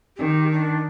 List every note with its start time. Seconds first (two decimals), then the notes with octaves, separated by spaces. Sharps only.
0.17 D#3 G4
0.51 D4